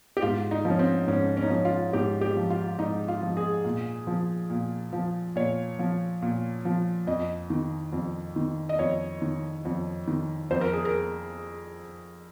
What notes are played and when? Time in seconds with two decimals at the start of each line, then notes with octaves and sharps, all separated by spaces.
0.17 G4
0.22 G#2 F4
0.51 D#4
0.65 F3
0.70 C#4
0.79 C4
1.07 G#2 C#4
1.37 C#4
1.43 D#4
1.50 F3 C#4
1.65 F4
1.93 G#2 G4
2.21 G4
2.37 F3
2.50 F4
2.78 G#2 D#4
3.08 F4
3.23 F3
3.37 G#4
3.65 A#2
4.07 F3
4.50 A#2
4.93 F3
5.36 A#2 C#5
5.79 F3
6.22 A#2
6.65 F3
7.07 F2 D#5
7.50 D#3
7.93 F2
8.36 D#3
8.69 D#5
8.79 F2 C#5
9.22 D#3
9.65 F2
10.08 D#3
10.51 F2 C5
10.61 A#4
10.73 G#4
10.85 A#4